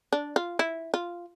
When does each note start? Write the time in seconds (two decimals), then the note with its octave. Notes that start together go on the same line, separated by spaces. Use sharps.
0.13 D4
0.36 F4
0.59 E4
0.94 F4